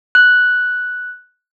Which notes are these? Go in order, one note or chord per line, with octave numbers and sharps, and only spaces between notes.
F#6